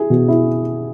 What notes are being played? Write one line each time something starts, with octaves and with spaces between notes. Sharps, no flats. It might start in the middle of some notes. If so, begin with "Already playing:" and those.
Already playing: E4 G#4
B2
E4